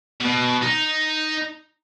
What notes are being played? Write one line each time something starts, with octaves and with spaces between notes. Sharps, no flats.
B2
D#4